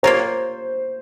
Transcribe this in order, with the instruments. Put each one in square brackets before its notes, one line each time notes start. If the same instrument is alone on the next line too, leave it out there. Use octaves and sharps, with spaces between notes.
[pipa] A#3 F4 A#4 C#5 [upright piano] C5